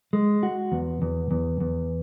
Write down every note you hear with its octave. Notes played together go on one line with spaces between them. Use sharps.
G#3
F#4
E2
E2
E2
E2